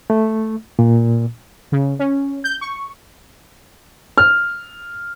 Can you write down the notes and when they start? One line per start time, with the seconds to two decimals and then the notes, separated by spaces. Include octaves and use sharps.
0.10 A3
0.79 A#2
1.72 C#3
1.99 C#4
2.44 G6
2.61 C#6
4.18 F6